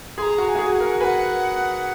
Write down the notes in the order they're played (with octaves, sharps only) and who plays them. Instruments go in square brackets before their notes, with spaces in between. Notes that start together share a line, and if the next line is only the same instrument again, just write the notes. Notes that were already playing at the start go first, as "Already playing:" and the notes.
[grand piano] G#4 [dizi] C6
[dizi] A#5
[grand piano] F#4
[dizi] A#5
G#5
[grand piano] F#4
G#4
[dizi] F#5
[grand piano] A#4
[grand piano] B4 [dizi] F#5 G#5